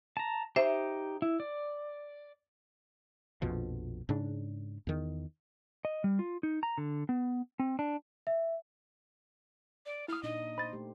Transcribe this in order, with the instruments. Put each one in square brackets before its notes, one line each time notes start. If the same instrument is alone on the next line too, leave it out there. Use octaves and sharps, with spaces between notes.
[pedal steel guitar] A5 A#5
[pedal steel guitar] D#4 G4 [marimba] C5 E5
[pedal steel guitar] E4
D5
[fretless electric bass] A#1 F2 B2 F3
G#2 C#3 D4
E2 D#3
[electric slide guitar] D#5
G3
F4
D#4
A#5
D3
B3
C4
D4
[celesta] E5
[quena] D5
[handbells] E4 D#6 [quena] F6
[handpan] A#2 D4 D#4 [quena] D#5
[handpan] C5 [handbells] B5 A6
[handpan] A3 G4